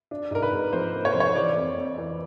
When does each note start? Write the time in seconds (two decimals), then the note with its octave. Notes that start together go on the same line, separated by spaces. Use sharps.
0.11 D4
0.31 G#2 A#4
0.42 B4
0.52 G#2
0.73 F3 C5
0.95 A#3
1.05 C#5
1.12 F3 C5
1.20 C#5
1.35 E3 D5
1.57 F2
1.78 F2
1.98 E3